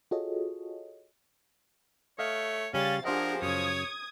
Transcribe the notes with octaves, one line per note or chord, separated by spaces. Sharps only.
F4 F#4 G#4 A4 C#5 D#5
A3 C#5 D#5 F5
C#3 G3 C#4 F5 A6
F3 D4 G4 G#4 A#4 C5 D#5 F#5
F#2 C#3 C#5 D#6 G#6